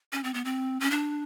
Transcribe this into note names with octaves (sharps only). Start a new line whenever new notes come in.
C#4
C4
B3
C4
C#4
D4